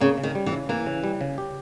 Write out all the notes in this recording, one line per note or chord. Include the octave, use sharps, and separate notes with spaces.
C#3 A#3
C#3
D#3
G3
E3
C#3
E3 A#3
C#3
G3
C#3
G4